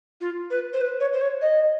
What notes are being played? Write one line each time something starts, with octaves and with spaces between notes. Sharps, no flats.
F4
B4
C5
B4
C#5
C5
C#5
D#5